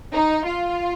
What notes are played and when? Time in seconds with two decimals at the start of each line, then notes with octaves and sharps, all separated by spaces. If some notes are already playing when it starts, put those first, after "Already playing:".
0.13 D#4
0.45 F4